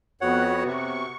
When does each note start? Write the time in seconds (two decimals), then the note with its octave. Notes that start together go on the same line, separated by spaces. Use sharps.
0.21 F2 B3 F#4 C#5 F#5
0.65 C3 C#6